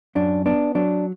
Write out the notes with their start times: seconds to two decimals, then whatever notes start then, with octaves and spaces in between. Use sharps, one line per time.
0.15 F#2 D4
0.46 B3 D4
0.75 F#3 D4